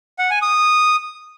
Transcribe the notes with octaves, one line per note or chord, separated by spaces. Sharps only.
F#5
G#5
D#6